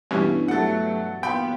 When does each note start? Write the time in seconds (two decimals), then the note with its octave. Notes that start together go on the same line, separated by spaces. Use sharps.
0.11 G2 B2 E3 C#4
0.48 F#3 A3 A4 F#5
1.23 F#3 A#3 B3 F4 G5 B5 C6